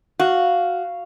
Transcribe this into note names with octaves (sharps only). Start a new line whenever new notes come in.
F#4 F5